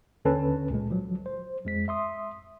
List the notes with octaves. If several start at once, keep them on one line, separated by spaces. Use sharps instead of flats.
D#2 D3 C#4 A4 B4 A5
C#2 A#2 G#3
F3 F#3
C5
F2 G#3 B6
E5 C6 D#6